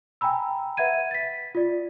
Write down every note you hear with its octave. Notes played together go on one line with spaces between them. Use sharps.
G5 G#5 A#5 B5 E6
B4 E5 F#5 G#6 D#7
A6 B6
F4 D5